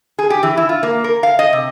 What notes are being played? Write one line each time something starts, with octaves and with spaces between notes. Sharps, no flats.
G#4
G4
E3
E4
F4
A#3
A#4
F5
D#5
C3